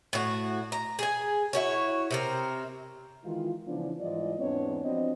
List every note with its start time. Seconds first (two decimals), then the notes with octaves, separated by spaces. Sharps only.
0.13 A2 F#4
0.72 A#5
0.99 G#4 G#5
1.53 E4 F#4 C#5
2.11 C3 C4 A#4
3.24 D#3 E3 G#3 F4
3.67 C#3 E3 F3 B3 D4
4.01 G#2 E3 G3 F4 D5 D#5
4.39 E2 G#2 B3 C4 D4 C#5
4.84 F3 B3 C4 D4 F#4 D#5